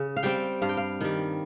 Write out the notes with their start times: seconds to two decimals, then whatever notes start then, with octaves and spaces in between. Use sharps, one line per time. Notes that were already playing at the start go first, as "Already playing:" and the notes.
Already playing: C#3
0.16 F5
0.23 G3 C4 G5
0.62 G2 F5
0.69 G5
0.77 F5
1.01 D#3 G3